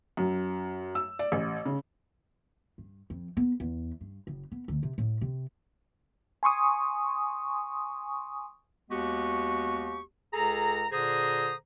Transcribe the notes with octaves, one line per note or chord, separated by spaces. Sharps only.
F#2
E6
D5
A1
C#3
G2
F2
B3
E2
G2
F#1
B3
D2
C3
A2
C3
G#5 C6 C#6 D#6
D#2 G#3 B3 F#4 G4 C#6
C#2 G#4 A4 A#5
A#2 D3 G#4 C5 A#5 D#6